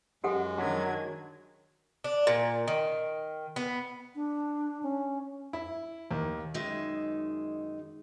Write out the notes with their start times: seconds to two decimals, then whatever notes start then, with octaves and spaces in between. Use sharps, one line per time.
0.24 F#2 G#3 G4 A4 F#5
0.58 D#3 F#3 D4 G#6
2.04 D4
2.27 A#2
2.68 D#3
3.56 B3
4.15 D4
4.83 C#4
5.53 E4
6.11 D#2
6.54 F#2 D#3 G#3 D#4 E5